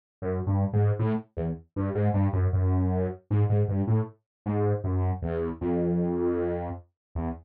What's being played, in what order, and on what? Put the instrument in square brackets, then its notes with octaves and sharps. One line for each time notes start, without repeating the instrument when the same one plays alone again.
[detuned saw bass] F#2
G2
G#2
A2
E2
G2
G#2
G2
F#2
F#2
G#2
G#2
G2
A2
G#2
F#2
E2
F2
E2